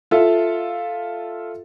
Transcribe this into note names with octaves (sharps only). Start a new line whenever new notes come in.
F4 A4 E5 F5